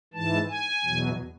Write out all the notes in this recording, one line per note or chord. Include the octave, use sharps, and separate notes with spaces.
G#2 E3 A5
G#5
E2 B2 F#3